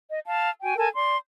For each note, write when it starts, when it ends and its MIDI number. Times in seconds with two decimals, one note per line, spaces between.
0.10 0.20 75
0.26 0.50 77
0.26 0.50 81
0.63 0.75 66
0.63 0.75 79
0.63 0.75 80
0.77 0.89 69
0.77 0.89 70
0.77 0.89 80
0.77 0.89 81
0.95 1.15 74
0.95 1.15 84